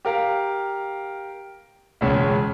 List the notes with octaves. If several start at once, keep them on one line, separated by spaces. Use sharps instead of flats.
G4 A#4 F5
E1 C#2 C#4